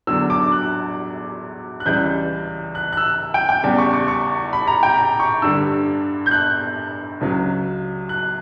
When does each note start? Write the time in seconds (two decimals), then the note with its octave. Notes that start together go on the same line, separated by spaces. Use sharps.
0.07 E2 D3 F#3 E6
0.30 D6
0.52 F#6
1.80 F#6
1.86 C#2 C#3 E3 G3 G6
2.75 F#6
2.93 F#6
2.97 E6
3.34 G5
3.49 G5
3.64 E2 C#3 G3
3.78 C#6
3.94 C#6
4.08 C#6
4.53 B5
4.67 A#5
4.83 G5
4.98 A#5
5.20 C#6
5.42 G2 D3 G3 E6
6.26 G6
6.31 F#6
7.21 C#2 C#3 F#3
8.09 F#6